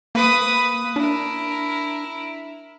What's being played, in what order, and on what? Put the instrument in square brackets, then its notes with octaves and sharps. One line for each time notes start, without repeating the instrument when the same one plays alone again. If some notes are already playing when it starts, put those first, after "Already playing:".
[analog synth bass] A#3 [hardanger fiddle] B4 D#6
[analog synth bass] D4 [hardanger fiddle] E4 A#4